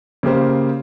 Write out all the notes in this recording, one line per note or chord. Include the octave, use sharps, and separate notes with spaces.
C#3 A#3 G4 C5